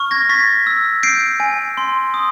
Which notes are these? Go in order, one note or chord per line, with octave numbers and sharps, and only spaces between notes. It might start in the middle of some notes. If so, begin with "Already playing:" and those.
Already playing: C#6 F6
G#6 A#6
C#6 A6 B6
E6
G6 C7 D7
G#5
C6
D#6